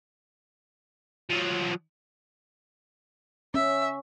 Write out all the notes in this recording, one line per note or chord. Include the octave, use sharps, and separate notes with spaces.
F3 F#3
C#4 E5